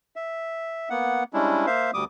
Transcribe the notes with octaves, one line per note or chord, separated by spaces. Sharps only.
E5
A#3 B3 F#5
G3 G#3 C#4 D4 E4
A#3 C5 E5 F5
D2 G3 D6 D#6